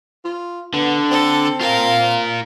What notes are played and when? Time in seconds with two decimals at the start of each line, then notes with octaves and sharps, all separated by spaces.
0.25 F4
0.74 D3 B3
1.11 C4 A4
1.61 F4 A#4 F5